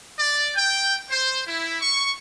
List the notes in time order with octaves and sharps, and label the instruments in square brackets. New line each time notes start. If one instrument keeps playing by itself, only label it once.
[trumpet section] D5
G5
C5
E4
C#6